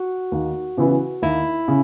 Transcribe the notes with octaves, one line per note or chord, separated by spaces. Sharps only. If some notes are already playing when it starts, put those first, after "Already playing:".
Already playing: F#4
D#2
C#3 E3 B3 E4
D#2 E4
C#3